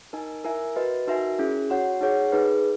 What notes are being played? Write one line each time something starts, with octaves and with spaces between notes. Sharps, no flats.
D#4 A#4 D#5 G#5
E4 A#4 E5 G#5
F#4 B4 D#5
D#4 F#4 A#4 E5 G#5
C#4 E4 G#4
F#4 C#5 F#5
D#4 G#4 C#5 F#5
D#4 G#4 B4